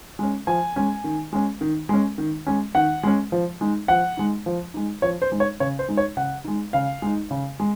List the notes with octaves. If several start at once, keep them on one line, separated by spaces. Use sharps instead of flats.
G#3 C#4
F3 G#5
G#3 C#4
D#3
G#3 C#4
D#3
G#3 C#4
D#3
G#3 C#4
D#3 F#5
G#3 C#4
F3
G#3 D#4
F3 F#5
G#3 D#4
F3
G#3 D#4
F3 C#5
C5
G#3 D#4
C#5
C#3 C#5
C5
G#3 D#4
C#5
C#3 F#5
G#3 D#4
C#3 F5
G#3 D#4
C#3
G#3